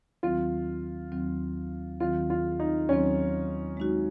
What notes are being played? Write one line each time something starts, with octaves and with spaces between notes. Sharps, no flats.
D#2 D#3 F#3 C4 F4
D#2 D#3 F#3 C4
D#2 D#3 F#3 C4 F4
F4
D#4
D#2 D#3 F#3 C4 C#4
G#3 D#4 F#4